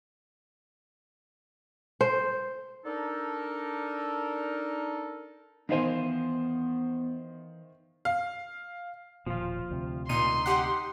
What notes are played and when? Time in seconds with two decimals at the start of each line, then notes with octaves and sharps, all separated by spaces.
2.01 C5
2.85 D4 D#4 A4 A#4
5.69 D#3 E3 B3 C5 F5 G#5
8.05 F5
9.26 E1 D#2 A#2 F3 F4
9.70 D2 C3
10.09 A#2 D#4 C6 D#7
10.46 G4 F#5